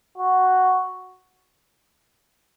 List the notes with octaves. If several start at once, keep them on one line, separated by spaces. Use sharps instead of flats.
F#4